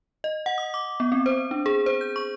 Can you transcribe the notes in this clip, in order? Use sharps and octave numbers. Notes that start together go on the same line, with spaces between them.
D#5
F#5
D#6
D6
B3
C4
C5
D4
G#4
C5
G6
C#6